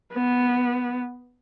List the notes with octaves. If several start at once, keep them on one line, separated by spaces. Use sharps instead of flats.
B3